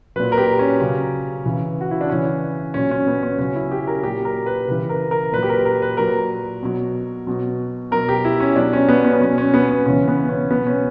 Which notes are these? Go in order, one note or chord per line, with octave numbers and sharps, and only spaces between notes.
A#2 F#3 B4
A#4
G4
C#4
C#3 F#3
C#3 E3
F#4
E4
D4
C#3 E3 C#4
A#2 F#3 C#4
C#4
B3
C#4
C#3 F#3 C#4
E4
G4
A#4
A#2 F#3 G4
A#4
B4
C#3 E3 B4
A#4
A#4
A#2 F#3 B4
G4
A#4
A#4
B4
A#2 F#3 A#4
B2 F#3
B2 F#3
B2 F#3 A#4
G4
E4
C#4
B2 F#3 D4
C#4
B3
C#4
B3
B2 F#3 C#4
C#4
B3
B3
C#3 E3 C#4
B3
C#4
B2 F#3 B3
C#4